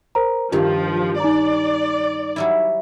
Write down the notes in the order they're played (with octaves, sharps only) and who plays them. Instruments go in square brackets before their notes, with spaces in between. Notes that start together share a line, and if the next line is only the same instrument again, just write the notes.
[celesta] A#4 C5 A#5
[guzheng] G2 D#3 [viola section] F3 [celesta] F4 G4
[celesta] D#4 A#5 [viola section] D5
[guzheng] F#3 G3 E4